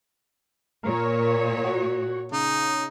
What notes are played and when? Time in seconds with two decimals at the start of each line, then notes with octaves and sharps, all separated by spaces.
0.83 A#2 A#4 C#5
1.64 F#4
2.32 C#3 D#4